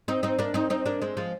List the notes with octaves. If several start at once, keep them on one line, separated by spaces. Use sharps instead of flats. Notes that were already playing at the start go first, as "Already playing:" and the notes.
C4 D#4
C4 D#4
A#3 D4
C4 D#4
C4 D#4
A#3 D4
G#3 C4
F3 G#3